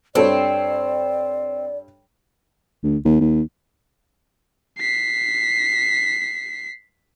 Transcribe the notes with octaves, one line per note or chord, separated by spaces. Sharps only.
G2 C4 A4 C#5 D5
D2
D#2
D#2
B6 C7